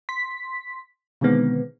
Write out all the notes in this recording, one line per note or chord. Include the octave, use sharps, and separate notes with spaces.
C6 B6
B2 D3 D#3 G#3 B3 C4